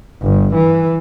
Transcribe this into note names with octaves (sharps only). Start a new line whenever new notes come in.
G1
E3